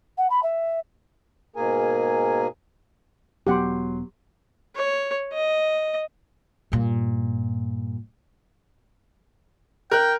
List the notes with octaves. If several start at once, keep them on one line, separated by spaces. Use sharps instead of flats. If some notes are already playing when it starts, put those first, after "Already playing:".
F#5
B5
E5
G#2 B2 A#3 G#4 A#4 G#5
E1 F#3 B3 G4 F#5 C6
C#5
D#5
G2 A#2
A#4 G5 F#6